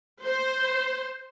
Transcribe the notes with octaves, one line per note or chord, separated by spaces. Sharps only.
C5